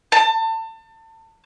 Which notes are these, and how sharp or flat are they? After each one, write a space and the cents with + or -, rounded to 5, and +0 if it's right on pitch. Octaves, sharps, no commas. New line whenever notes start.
A5 +30